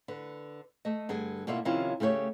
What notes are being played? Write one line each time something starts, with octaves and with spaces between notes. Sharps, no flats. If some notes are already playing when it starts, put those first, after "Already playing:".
D3 B4
A3 D#5
G2 D3 G#4 G#5
B2 A#3 E4 F4 D5 E5
C3 D#3 F3 C#4 E4 F4
C#3 A3 G4 C5 C#5